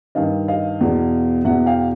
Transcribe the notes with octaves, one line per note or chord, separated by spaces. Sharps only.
G2 D#3 D#5 F5
D#5 F5
E2 B2
E2 B2 E5 F#5
F5 G5